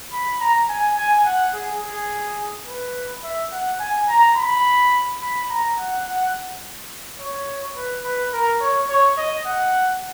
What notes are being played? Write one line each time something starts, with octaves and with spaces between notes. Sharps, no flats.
B5
A#5
G#5
G#5
F#5
G#4
G#4
B4
E5
F#5
G#5
A#5
B5
B5
A#5
F#5
F#5
C#5
B4
B4
A#4
C#5
C#5
D#5
F#5